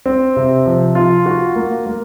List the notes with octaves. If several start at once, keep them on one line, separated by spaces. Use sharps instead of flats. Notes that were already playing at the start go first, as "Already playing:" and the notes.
C4
C3
F3
F4
F#4
A#3
A#3